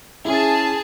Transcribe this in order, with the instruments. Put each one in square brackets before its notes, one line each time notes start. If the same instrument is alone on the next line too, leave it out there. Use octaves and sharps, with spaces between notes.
[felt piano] C#4 E4 [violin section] G#4 A5